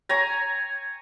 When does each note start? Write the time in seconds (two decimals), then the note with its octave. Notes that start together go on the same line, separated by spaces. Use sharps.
0.09 C#5 G#5 A#5